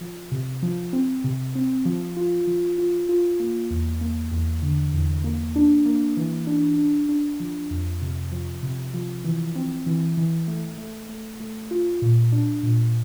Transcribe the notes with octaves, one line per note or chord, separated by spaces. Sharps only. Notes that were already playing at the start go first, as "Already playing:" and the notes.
F3
C3
F3
C4
C3
C4
F3
F4
F3
F4
F4
A#3
E2
A#3
E2
D3
E2
A#3
D4
A#3
E3
D4
D4
D4
F3
F2
C3
F3
C3
F3
E3
C4
E3
E3
A3
A3
A3
A3
F4
A#2
D4
A#2